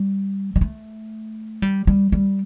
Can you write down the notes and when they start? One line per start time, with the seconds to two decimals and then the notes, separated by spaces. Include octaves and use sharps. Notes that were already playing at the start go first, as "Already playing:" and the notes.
Already playing: G3
0.56 G3
0.61 A3
1.62 G3
1.87 G3
2.12 G3